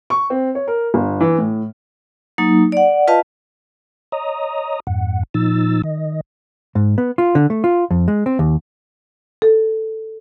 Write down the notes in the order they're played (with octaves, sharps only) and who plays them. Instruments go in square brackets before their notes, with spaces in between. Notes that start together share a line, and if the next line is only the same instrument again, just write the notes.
[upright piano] C#6
C4
C#5
A#4
G1
E3
A2
[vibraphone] F#3 A#3 D#4
D5 F#5
F4 B4 D#5 F5 A5
[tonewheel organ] C#5 D#5 A#5 D#6
F2 G#2 F#5
A#2 F3 D#4 E6 A6
D#3 D#5
[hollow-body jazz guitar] G#2
B3
F4
D3
A3
F4
F2
G#3
C4
D#2
[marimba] A4